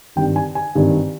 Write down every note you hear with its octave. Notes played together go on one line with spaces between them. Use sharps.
G#1 G2 D#3 G5
G#5
G#5
G#1 G2 D#3